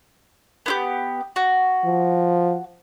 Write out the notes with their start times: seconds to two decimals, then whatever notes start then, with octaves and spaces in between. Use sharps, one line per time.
0.66 B3 E4 G4
1.36 F#4
1.85 F3